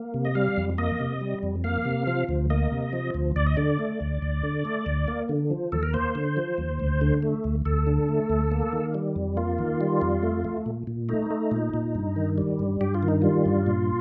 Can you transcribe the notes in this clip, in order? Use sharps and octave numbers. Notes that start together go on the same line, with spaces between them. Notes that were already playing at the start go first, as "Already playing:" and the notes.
Already playing: A#3
C3
D#5
G3 F5
F2
A#3 D#5
C3
G3
F2
A#3 F5
C3
F3
D2
A#3 D#5
C3
F3
D2
D2 D5
D#5
D3 D5
A3
D2
D2
D3
A3
D2
A#3
D3
F3
D#2 A4
A#4
A#3 C5
D3
F3
D#2
D2
D3
A3
D2
D2 A4
D3
A3
D2
A#3
D#3
G3
F2
A#3 F4
D#3
G3
F2
A3
A3
A#2
A#2
A3 D#4
A3
A#2
A#2
G2
D#3
G3
G2
G2 G4
F4
D#3
D#4
G3 F4
G2
A#2